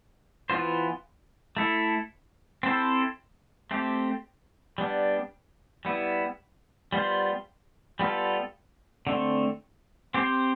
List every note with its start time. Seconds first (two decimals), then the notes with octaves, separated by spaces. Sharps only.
0.50 E3 B3 F4 C5
1.57 A3 E4 A4
2.63 C4 E4 A4 C5
3.71 A3 C4 G4
4.78 G3 B3 D4
5.85 G3 B3 E4
6.92 G3 B3 F4 C5
8.00 G3 B3 F4 A4
9.07 D3 A3 C4
10.14 C4 G4 C5